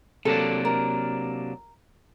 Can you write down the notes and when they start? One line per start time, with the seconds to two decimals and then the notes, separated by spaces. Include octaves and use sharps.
0.25 C3 F#3 A#3 D4 A4
0.65 A#4